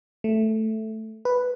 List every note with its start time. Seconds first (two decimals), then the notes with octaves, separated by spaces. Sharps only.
0.24 A3
1.25 B4